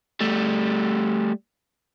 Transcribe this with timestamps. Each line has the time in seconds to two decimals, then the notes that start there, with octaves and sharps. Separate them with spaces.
0.20 G3 A3